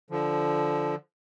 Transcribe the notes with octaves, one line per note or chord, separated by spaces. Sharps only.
D3 F3